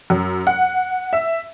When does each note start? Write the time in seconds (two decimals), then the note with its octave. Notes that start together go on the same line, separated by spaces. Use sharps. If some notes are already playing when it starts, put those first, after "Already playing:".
0.10 F#2
0.47 F#5
1.13 E5